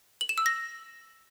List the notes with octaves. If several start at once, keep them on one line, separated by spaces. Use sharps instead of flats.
F#7
E7
E6
A#6